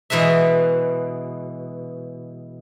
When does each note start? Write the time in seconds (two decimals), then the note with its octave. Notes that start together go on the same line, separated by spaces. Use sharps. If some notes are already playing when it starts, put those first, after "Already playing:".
0.10 B2 E3 G#3 B4 E5